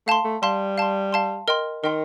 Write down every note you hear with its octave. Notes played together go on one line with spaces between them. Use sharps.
A3 F5 A5 C6
A3
G3 F5 A5 C6
F5 A5 C6
F5 A5 C6
A#4 D#5 G5 C6
D#3 A#4 D#5 G5 C6